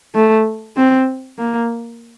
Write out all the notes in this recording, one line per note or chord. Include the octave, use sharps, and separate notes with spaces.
A3
C4
A#3